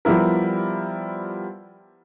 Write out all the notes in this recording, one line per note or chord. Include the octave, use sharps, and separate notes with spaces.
F3 G3 B3 E4 A#4